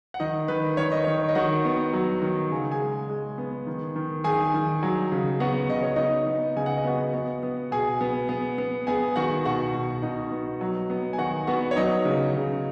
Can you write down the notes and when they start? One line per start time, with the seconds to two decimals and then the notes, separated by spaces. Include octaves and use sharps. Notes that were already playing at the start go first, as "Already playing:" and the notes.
0.14 F#5
0.20 D#3 D#4 D#5
0.48 D#3 B4
0.77 D#3 C#5
0.92 D#5
1.04 D#3 C#5
1.29 D#5
1.35 D#3 F#4 F#5
1.65 B3
1.93 F#3
2.22 D#3
2.51 C#3 G#5
2.71 G#4 G#5
2.81 G#3
3.10 G#3
3.38 B3
3.67 D#3
3.96 D#3
4.24 D#3 G#4 G#5
4.54 D#3
4.83 F#3
5.12 C#3
5.40 B3 F#4 F#5
5.69 C#3 D#5
5.83 C#5
5.96 B3 D#4 D#5
6.27 B3
6.56 C#3 G#5
6.66 F#5
6.77 D#5
6.84 B3 F#4 F#5
7.14 B3
7.43 B3
7.71 B2 G#4 G#5
8.01 B3
8.29 B3
8.58 B3
8.87 B3 G#4 G#5
9.16 D#3 F#4 F#5
9.45 B2 F#4 F#5
9.75 B2
10.02 B2 D#4 D#5
10.31 B3
10.61 F#3
10.90 B3
11.13 G#5
11.18 D#3 F#4 F#5
11.47 B3 F#4 F#5
11.71 C#5
11.76 F#3 D#4 D#5
12.05 C#3
12.34 C#3